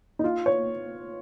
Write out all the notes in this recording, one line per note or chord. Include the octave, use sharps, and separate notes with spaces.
D#4
F4
C#5